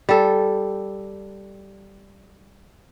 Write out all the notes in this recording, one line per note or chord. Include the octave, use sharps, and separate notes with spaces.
G3 A4